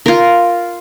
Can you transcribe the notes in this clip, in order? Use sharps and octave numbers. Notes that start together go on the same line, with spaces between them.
F4 A#4